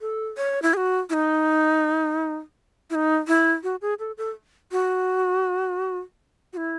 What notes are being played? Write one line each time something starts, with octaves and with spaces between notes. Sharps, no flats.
A4
C#5
E4
G#4
F#4
E4
D#4
E4
D#4
E4
F#4
G#4
A4
A4
F#4
F#4
E4